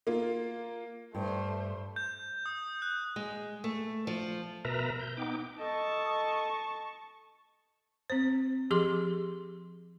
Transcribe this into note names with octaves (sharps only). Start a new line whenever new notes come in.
A#3 F4
G2 A3 C5
G6
D#6
F#6
G#3
A3
F3
B2 A#4 B4 E5 A#5
G6
B3 D#4 G5 D6
A4 D#5 A5 C#6
C4 C5
F3 G4 G#4 C6 D6